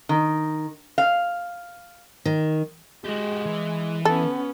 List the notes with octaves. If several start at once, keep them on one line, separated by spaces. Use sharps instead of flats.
D#3
F5
D#3
G#3 F#4 G4
E3
B3 C#4 A4